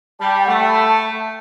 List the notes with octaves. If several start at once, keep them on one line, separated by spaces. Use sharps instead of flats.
G3 A5
G5
A3 F#5
G5
B5
A5